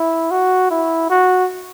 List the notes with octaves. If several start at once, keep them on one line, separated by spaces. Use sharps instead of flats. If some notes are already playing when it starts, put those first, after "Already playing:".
Already playing: E4
F#4
E4
F#4